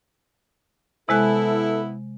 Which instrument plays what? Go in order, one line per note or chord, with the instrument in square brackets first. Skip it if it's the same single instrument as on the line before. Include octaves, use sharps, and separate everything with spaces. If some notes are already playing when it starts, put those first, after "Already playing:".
[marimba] C3 G#3 F#6 [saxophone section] B3 E4 [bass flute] A4